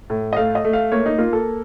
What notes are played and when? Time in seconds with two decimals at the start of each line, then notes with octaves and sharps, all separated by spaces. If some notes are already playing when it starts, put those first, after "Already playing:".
0.10 A2
0.33 D#5
0.36 A3 F5
0.55 D#5
0.65 A3
0.73 F5
0.92 A#3 C#5
1.06 D#4
1.18 A#3 F4
1.33 A4